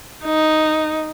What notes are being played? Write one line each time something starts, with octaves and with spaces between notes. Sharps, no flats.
D#4